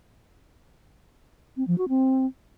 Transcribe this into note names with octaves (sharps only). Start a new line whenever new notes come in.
C4
F3
F#4
C4